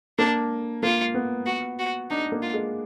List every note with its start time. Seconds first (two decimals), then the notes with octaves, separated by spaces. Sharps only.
0.19 A#3 D4
0.83 A#3 F4
1.14 B3
1.47 F#4
1.79 F#4
2.10 D4 D#4
2.32 A#3
2.42 F4
2.54 G#3